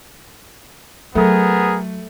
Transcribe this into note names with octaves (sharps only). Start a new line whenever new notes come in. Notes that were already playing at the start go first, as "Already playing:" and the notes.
F#3 A3 B3 G#4 A#4